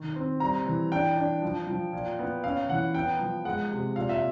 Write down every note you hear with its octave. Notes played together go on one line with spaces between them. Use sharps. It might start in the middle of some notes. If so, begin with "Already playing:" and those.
Already playing: D#3
C4
G3 A#5
E3
D4 G5
D4
F3
F3
A#2
B3
C#4 F5
E3 F#5
B3 G5
F3
G#3 F#5
C3
A#2 F5
E5